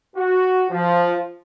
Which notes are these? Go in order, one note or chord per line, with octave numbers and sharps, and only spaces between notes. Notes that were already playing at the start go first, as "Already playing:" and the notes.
F#4
F3